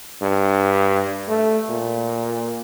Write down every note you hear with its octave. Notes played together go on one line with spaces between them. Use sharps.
G2
A3
A#2